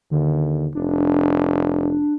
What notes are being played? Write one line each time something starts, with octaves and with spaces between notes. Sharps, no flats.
D#2 D3
F1 D4